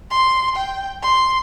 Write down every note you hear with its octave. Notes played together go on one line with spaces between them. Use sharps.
C6
G5
C6